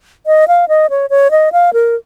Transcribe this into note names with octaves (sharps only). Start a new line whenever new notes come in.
D#5
F5
D#5
C#5
C#5
D#5
F5
A#4